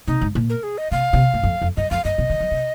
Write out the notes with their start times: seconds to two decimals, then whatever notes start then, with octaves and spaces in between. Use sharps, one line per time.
0.07 C3 D#4
0.21 G#2
0.35 A#2
0.50 A#4
0.63 G#4
0.78 D#5
0.91 C3 F5
1.13 C3
1.34 G2
1.43 F2
1.62 F2
1.77 G2 D#5
1.91 F2 F5
2.05 G2 D#5
2.18 C3
2.30 D#3
2.40 F3
2.51 C3